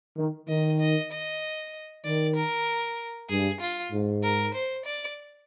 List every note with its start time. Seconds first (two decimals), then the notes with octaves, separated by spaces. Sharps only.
0.18 D#3
0.48 D#3 D#5
0.80 D#5
1.12 D#5
2.05 D#3 D5
2.36 A#4
3.29 G2 G#4
3.60 F4
3.92 G#2
4.23 A#4
4.54 C5
4.85 D5